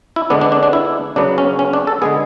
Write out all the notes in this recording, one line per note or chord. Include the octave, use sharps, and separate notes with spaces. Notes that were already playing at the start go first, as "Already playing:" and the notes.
E4
D3 G#3 B3 D4
D4
D4
D4
E4
C#3 F#3 B3 D4
C#4
C#4
D4
A4
D3 G#3 B3 G#4